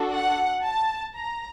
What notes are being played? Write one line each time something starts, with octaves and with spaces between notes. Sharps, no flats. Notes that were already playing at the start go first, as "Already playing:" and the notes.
Already playing: D4 F#4 A4
F#5
A5
A#5